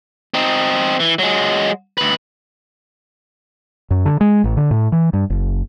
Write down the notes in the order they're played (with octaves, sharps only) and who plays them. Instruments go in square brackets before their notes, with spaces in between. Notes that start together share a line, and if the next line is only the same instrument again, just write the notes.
[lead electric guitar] C4 D#4
E3
F#3 G#3
D2 B4
[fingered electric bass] F#2
D3
G#3
A1
D3
A2
E3
G2
F#1